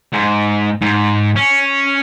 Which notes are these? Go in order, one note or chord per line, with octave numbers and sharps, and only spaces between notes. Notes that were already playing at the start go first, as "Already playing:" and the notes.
G#2
G#2
C#4